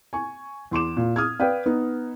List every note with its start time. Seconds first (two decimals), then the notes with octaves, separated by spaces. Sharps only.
0.13 G#5 C#6
0.71 E2 C6 D6 E7
0.97 A#2
1.16 D#6 F6 G#6
1.40 B4 D5 F5 G5
1.66 B3 D#4